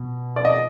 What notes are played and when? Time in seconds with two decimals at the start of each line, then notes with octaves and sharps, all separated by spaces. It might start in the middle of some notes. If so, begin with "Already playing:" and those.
Already playing: B2
0.36 D5
0.45 D#5